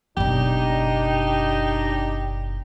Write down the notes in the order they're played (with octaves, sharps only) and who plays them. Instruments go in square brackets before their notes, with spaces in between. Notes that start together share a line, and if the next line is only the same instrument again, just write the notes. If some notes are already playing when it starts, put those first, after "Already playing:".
[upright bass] F#1 B2 [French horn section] D4 D#4 [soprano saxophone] G4